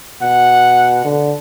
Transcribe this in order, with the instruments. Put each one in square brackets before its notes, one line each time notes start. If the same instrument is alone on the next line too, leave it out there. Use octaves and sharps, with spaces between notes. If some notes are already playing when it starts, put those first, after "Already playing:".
[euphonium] B2 [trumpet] F#5
[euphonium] D3